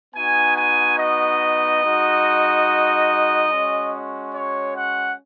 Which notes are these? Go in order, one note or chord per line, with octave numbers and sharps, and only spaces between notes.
B3 D#4 F#4 G#5
G#5
D#5
G#3 D#4 F#4
G#3 C#4 F#4
C#5
F#5